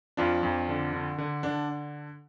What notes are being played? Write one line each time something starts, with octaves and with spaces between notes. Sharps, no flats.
F2 D4 F4
F2
D3
D3
D3
D3 D4